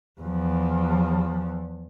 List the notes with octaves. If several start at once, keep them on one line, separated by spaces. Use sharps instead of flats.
E2 F3